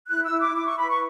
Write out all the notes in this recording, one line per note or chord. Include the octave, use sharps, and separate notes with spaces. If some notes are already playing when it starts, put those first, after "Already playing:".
E4 F#6
E6
E4
D6
E4 D6
C#6
B4 B5
C#6